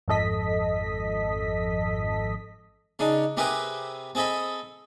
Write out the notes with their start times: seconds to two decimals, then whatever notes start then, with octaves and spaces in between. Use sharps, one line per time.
0.08 G#1 F2 A4 D#5 B6
2.99 C#3 D4 D#4
3.37 C3 C4 G4 G#4 A#4 B4
4.15 C4 G#4 A4 D#5 B5